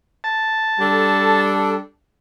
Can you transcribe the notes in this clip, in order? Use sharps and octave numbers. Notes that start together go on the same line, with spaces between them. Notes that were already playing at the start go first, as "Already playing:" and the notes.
A5
G3 D4 A4